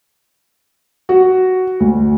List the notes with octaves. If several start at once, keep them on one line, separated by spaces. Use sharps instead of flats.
F#4
D2